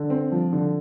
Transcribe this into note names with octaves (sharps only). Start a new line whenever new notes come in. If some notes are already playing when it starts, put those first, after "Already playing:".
Already playing: D3
C4
F3
D3